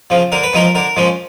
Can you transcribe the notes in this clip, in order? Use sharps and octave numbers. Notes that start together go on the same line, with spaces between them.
C#3 F3
D3 A#4
B4
F3 G#3 C#4 A#4
D3 A#4
F3 G#3 C#4